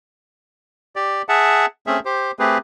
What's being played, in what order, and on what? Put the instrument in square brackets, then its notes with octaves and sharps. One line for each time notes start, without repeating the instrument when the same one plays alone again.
[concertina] G4 D5
G#4 E5 F#5 A5
A3 C4 C#4 G#4 E5
G4 C5
A3 C4 G4 G#4 B4